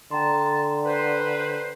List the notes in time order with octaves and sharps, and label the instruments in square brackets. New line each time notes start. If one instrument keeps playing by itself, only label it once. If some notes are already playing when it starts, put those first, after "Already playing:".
[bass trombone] D3 [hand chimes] G5 A#5 C6 [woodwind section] A5
[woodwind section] B4 C5